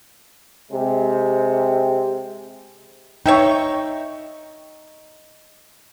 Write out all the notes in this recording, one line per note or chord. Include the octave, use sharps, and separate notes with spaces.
C3 G#3
D#4 C#5 E5 G5